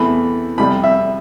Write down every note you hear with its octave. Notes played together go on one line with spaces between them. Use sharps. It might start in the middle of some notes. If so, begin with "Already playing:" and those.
Already playing: E2 C3 E3 A3 B5
F2 C3 G3 B5
E5